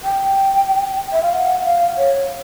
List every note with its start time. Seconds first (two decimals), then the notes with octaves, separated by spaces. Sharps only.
0.04 G5
1.12 E5
1.23 F5
1.33 F#5
1.65 F5
1.98 C#5